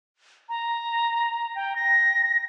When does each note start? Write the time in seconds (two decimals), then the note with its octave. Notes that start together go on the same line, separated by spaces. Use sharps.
0.49 A#5
1.55 G5
1.76 A#6